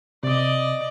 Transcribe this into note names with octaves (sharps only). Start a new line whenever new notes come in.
C3 D5 D#5 D6